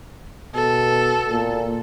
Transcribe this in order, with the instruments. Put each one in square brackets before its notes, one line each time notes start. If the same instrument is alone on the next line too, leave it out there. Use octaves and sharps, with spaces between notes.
[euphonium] B2 [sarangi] A4
[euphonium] A#2